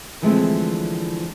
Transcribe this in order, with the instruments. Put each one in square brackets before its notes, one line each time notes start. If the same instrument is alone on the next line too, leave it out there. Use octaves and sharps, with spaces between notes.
[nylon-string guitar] D3 E3 F3 G#3 A3 C4